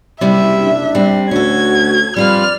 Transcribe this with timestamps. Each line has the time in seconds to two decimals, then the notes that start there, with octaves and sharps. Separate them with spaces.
0.21 F#1 C3 G3 E4 E5
0.62 D4
0.95 G3 C4
1.31 D2 C#4 F#4 A4 G#6
2.17 F2 G3 F4 B4 D5 F6